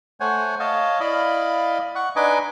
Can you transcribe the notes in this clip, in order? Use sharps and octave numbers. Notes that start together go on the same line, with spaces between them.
A3 C5 C#5 F#5 G#5
C#5 D#5 F5 A5
E4 D5 D#5 F5 B5
F#5 C#6
D4 D#4 B4 D#5 G#5 D6